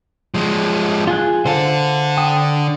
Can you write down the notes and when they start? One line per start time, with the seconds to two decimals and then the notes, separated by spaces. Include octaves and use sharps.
0.34 F3 G#3
1.07 F4 G#4 F#6
1.45 D3 A4 C5 F5
2.17 G5 D#6